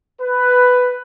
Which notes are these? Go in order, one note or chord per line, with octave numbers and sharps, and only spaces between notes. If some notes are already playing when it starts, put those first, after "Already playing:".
B4